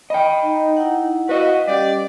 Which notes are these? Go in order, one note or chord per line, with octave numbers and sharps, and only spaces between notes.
D#5 G5 B5
D#4
E4 F#5
F#4 B4 D#5 F5
G3 C#4 G4 D5